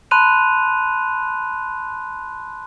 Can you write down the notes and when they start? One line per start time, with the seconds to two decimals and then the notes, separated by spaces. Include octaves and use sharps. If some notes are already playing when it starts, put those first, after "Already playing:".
0.11 A5 B5 C6 F#6 D#7 F7